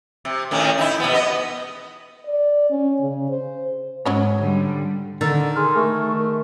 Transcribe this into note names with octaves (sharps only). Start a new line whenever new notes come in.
C3
A2 D#3 C#4
D#4 E4
B2 B3
B3 D#5
D5
C#4
C#3
C5
G#2 F#3 G#3 C#4 C#5
D3 G3
D3 D#3 E6 A6
G#4 C6 F6
A3 A#4 C#6 F6